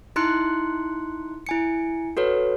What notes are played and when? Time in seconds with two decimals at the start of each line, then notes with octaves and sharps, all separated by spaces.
0.16 D#4 E4 C6 F#6 C#7
1.47 E4 G#5 C#7
2.17 F#4 A4 B4 C#5